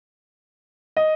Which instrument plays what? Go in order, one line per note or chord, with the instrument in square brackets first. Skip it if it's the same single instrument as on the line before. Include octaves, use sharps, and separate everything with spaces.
[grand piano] D#5